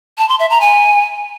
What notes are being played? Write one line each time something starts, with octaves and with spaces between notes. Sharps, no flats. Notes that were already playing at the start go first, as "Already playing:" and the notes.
A5
C6
E5
A#5
G#5